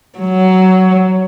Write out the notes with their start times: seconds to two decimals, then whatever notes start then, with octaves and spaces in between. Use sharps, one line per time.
0.19 F#3